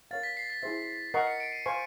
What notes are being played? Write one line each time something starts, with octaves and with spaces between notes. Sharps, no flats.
A#4 C#5 F5 A6
B6
C7
B6
E4 G#4 C5 E5
A#4 D#5 F#5 A#5 C#6 C7
C#7
D7
D#7
C5 F5 G#5 C#6 D#7